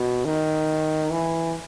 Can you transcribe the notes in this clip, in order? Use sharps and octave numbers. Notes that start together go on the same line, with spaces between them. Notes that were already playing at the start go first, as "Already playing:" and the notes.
Already playing: B2
D#3
E3